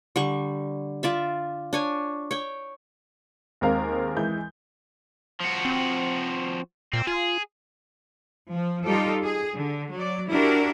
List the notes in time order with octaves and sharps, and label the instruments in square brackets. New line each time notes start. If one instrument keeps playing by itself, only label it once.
[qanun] D3 G3 C#6
F4 D5 E5
D4 C#5 G#5
C#5 G5
[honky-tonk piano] D#2 G#3 C4 A#4 F5 A#5
E3 G#3 G6
[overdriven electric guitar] F3 F#4
[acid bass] C4
[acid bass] A#2 [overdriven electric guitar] C4
[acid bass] F4 [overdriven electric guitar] G#4
[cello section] F3
G3 D#4 F4 G4 A4
G#4
D3
F#3 D5
D4 E4 F#4 G4 A#4